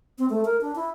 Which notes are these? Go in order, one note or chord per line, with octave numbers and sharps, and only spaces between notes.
C4
A3
A#4
D4
E4